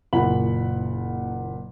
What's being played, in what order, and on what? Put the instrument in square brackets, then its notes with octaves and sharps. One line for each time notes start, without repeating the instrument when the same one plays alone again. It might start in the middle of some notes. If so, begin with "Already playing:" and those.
[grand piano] F#1 A#2 E4 F#5 B5 F#7